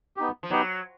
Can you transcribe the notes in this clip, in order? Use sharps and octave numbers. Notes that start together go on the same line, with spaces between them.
B3 D#4 G4
F3
F#3 B3 D#4 G4